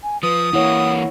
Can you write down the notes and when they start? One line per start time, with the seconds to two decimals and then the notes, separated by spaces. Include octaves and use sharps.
0.03 G#5
0.23 F3 B4 D#6
0.53 E3 A#3 E4 C#5 F#5